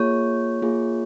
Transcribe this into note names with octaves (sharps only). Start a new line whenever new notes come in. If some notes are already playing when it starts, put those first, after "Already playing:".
Already playing: A#3 F4 G#4 C#5
A#3 F4 G#4